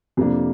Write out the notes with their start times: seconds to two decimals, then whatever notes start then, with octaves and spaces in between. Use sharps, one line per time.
0.17 F2 C3 F3 A#3 D4